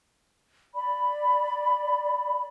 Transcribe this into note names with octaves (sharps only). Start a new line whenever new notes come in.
D5 B5